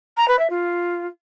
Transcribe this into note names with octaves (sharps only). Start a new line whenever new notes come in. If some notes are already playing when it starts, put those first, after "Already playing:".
A#5
B4
E5
F4